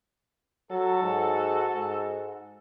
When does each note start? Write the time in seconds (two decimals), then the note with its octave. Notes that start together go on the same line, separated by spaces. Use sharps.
0.71 F#3 F#4 A4
1.03 G#2
1.75 G#2